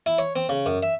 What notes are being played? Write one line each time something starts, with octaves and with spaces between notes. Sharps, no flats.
E4
C#5
C4
C#3
F#2
E5